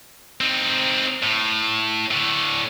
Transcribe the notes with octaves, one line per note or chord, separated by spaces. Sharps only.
C4 D#4
A2
A2 D3